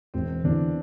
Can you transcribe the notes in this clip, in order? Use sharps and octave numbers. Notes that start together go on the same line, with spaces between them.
E1 C4
E2 D3 D4